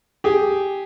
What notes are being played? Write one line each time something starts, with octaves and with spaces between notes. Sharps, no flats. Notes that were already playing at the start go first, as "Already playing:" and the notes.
G4 G#4